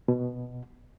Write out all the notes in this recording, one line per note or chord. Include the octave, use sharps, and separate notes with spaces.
B2